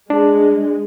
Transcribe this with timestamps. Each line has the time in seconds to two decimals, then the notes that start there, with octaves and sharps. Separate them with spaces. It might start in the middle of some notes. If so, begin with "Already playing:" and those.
0.10 G#3 D4